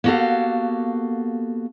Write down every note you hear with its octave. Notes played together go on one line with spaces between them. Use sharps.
A#3 B3 F#4 G4 A4 F5